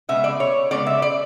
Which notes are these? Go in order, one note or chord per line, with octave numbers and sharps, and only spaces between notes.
C#3 G#3 B3 E5
D5
C#5
C#3 G#3 B3 D5
E5
D5